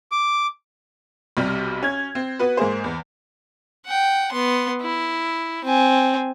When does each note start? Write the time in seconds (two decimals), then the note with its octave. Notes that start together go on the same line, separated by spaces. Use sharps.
0.12 D6
1.37 B1 C3 G3 F6
1.82 C#4 G#6
2.15 C4
2.39 B3 F#4 B4
2.57 G#2 A#3 G#4 C5
2.84 E2
3.86 F#5 G5
4.32 B3 C6
4.82 E4
5.65 C4 G#5